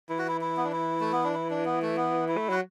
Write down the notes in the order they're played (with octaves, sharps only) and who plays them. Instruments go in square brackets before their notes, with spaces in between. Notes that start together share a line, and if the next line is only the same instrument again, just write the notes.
[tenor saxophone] E3 [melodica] E4
[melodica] F#4
E4
E4
B3
D4
E4
A3
B3
D4
E4
D4
B3
A3
B3
E4
[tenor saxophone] A3
[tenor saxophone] F#3 [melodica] F#4